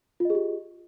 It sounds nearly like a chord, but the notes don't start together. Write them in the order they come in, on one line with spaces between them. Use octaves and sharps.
F4 D#5 G#4 G4